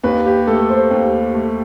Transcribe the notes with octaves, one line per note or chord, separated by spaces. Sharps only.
D#2 B4
G4
A3 A4
C5
D#2
A3